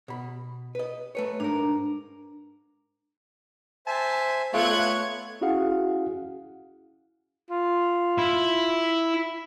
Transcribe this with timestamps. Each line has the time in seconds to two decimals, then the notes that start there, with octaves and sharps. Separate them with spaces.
0.08 B2 B5
0.75 B4 D#5
1.15 A3 B4 C#5
1.40 G#2 D4 A#4
3.87 C5 E5 G#5 A5
4.54 A3 B3 F4 C#5 C#6 F#6 G#6
5.41 C#4 E4 F#4 G#4 F5 F#5
7.50 F4
8.18 E4